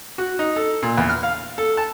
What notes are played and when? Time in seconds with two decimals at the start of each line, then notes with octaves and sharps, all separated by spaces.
0.18 F#4
0.39 D#4
0.56 A4
0.83 A#2
0.98 E2
1.09 F6
1.23 F5
1.58 A4
1.77 A5